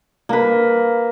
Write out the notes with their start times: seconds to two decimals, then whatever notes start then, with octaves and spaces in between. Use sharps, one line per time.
0.29 A#3 B4